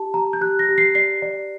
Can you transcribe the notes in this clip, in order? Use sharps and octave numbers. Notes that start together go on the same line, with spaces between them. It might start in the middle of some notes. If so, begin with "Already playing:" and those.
Already playing: G4 A5
G4 A#5
G6
G4 F#6
A#6
G4
C7
D5 C7
D5